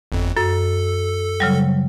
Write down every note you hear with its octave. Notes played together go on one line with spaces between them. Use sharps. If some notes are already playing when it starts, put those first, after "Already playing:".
G1 F2
F#2 A4
C#3 F#3 G3